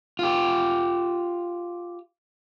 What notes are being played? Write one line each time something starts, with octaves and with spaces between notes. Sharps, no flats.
F4 G4